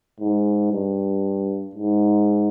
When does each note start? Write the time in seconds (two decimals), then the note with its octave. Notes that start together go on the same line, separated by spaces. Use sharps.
0.20 G#2
0.72 G2
1.75 G#2